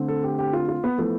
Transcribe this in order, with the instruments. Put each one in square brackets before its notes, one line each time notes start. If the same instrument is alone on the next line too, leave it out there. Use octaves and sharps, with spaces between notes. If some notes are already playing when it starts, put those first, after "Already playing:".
Already playing: [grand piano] D3 A3 C4
[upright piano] A4
G4
G4
F4
F4
B3
[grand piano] F3 B3 E4 [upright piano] A3